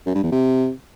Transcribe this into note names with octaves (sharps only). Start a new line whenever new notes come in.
F#2
G2
E2
C3